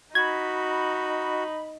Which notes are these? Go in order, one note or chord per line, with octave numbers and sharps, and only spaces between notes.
D#4 F#4 B5 G#6